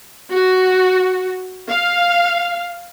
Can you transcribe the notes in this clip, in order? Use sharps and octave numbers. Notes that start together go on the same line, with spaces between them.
F#4
F5